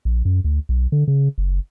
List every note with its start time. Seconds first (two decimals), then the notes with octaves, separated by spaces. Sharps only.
0.05 A#1
0.25 F#2
0.44 D2
0.69 B1
0.92 D3
1.08 C#3
1.38 F#1